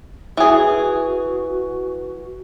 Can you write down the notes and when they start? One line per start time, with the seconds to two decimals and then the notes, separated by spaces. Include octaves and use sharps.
0.37 E3 F#4 G#4